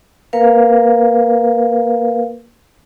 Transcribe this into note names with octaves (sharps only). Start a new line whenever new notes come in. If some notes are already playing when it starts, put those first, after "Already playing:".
A#3 A#4 B4 F5